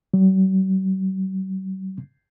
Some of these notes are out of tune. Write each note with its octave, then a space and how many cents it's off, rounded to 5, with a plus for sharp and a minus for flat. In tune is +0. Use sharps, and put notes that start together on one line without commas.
F#3 +45